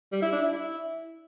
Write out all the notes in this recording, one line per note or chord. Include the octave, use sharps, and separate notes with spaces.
G3
E4
D4
E4
E4